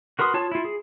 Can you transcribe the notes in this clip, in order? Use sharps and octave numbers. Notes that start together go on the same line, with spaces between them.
F#4 A#4 B4 C6 D#6
F4 C#5 A5
E4 F4
G#4